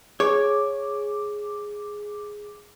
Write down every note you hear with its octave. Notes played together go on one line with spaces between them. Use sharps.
G#4 C#5 D6